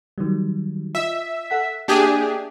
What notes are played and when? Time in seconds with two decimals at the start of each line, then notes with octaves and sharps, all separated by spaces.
0.18 D#3 F#3 G3
0.95 F4 D#5 E5
1.50 A4 F#5 B6
1.88 A#3 D4 G4 G#4 D#5 E5